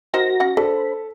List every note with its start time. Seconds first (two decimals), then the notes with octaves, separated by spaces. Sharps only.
0.14 D#4 F#4 A#4 C5 A#6
0.40 C#4 F#5
0.57 D4 A4 C5 B5